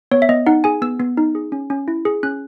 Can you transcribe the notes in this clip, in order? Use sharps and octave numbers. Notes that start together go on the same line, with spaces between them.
B3 C#5
E5
B3 D#5
D#4 F#5
G#4 G#5
B3 E6
B3
D#4
G#4
C#4
C#4
E4
G#4
C#4 F#6